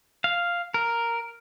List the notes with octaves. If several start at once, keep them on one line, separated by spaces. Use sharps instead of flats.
F5
A#4